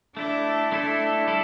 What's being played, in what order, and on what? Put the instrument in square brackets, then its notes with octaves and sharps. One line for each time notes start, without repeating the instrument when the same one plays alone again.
[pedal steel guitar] A3 E4 A4 [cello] D4
[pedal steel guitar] A3 E4 A4 [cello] D4
[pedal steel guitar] G3 E4 A4